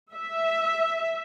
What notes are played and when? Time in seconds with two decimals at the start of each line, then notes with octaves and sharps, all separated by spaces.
0.13 E5